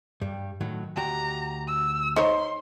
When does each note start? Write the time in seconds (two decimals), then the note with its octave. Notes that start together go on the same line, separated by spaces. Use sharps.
0.21 G2 G3
0.61 A2 D#3 F#3
0.97 D2 F#4 G4 A#5
1.68 E6
2.16 D#4 C5 C#5 C6